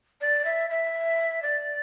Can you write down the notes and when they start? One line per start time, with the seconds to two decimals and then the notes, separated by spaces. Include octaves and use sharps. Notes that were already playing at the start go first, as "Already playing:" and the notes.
0.21 D5
0.45 E5
0.70 E5
1.42 D5